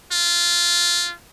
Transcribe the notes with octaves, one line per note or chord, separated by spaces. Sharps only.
F4